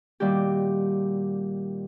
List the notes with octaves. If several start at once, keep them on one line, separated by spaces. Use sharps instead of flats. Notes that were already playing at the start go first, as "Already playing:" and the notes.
A#2 D#3 G3 F#4 G4